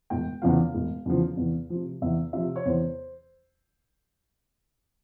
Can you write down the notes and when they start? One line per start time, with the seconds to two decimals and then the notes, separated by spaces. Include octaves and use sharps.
0.10 E1 G5
0.42 E2 C#3 F3 F5
0.74 E1
1.06 E2 C#3 F3
1.37 E2
1.70 C3 F3
2.02 E2 E5
2.33 C3 F3 E5
2.56 C#5
2.66 E2 C5